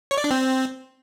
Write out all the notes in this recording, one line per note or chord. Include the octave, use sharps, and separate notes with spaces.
C#5
D5
D4
C4